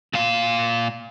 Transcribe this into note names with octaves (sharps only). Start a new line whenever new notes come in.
A#2 F5